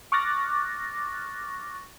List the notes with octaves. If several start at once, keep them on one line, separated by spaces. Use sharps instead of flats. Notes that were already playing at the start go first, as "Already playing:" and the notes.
C#6 D6 F6 F#6 A6 A#6